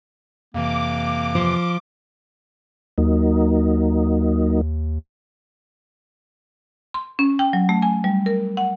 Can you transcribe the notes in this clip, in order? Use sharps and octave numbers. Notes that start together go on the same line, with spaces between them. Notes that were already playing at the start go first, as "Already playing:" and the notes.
F2 C3 E3 A#3 D6
F3
D#2 F#3 A#3 D#4
C6
C#4
G5
F#3
A3
G#5
G3
A#4
F#5